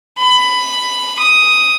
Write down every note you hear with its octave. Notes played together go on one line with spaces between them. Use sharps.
B5
D#6